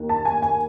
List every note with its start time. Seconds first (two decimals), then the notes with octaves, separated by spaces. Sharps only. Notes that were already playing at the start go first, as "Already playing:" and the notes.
Already playing: D#2 D#3
0.09 A5
0.25 G#5
0.42 G#5